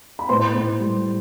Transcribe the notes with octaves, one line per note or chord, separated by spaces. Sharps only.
B5
A2 C5 C6
A2
G3